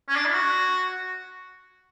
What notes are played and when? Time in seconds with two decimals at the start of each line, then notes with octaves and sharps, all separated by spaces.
0.08 C#4
0.16 D4
0.25 E4
0.34 F#4